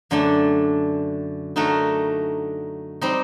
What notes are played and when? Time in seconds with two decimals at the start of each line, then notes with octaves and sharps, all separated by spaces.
0.11 F#2 D3 A3 D4
1.56 D3 A3 D#4 F#4 A#4
3.02 G3 C4 D#4